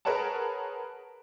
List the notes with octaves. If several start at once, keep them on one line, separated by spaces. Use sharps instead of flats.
G#4 A#4 B4 C#5 F#5 A5